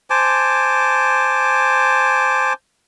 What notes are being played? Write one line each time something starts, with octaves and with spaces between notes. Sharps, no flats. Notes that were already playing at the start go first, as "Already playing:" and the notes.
C5 G#5 A5 D6